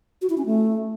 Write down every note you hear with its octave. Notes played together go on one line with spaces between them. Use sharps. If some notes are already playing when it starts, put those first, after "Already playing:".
F#4
E4
C#4
A3